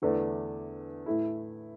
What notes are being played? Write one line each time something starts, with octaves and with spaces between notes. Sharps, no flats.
E2 D3 A3 D4 A4
A2 A3 E4